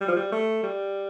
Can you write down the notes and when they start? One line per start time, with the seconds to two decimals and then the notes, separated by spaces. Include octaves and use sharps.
0.01 G3
0.08 F3
0.16 G3
0.32 A3
0.63 G3